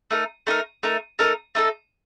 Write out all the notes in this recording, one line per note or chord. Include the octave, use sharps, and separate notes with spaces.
A3 D#4 A#4
A3 D#4 A#4
A3 D#4 A#4
A3 D#4 A#4
A3 D#4 A4